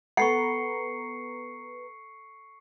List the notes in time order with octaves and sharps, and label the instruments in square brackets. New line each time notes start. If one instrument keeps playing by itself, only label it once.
[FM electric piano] B3 B4 A#5 [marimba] A4 [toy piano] F#5 [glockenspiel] C#6 C7 C#7